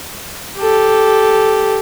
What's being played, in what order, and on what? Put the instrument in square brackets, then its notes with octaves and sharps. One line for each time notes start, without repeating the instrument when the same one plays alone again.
[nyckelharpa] G4 A4